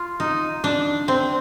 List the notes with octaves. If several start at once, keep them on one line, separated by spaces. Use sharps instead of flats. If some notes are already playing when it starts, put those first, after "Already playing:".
Already playing: F4
D#4
D4
C4